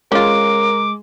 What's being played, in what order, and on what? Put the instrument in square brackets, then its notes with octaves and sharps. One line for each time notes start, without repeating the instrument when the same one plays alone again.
[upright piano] G#3 [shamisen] C#4 F4 [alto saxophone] A#4 [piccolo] D6